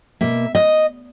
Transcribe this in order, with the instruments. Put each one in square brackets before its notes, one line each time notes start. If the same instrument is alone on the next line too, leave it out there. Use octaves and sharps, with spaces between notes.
[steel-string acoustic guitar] B2 A#3 E5
D#5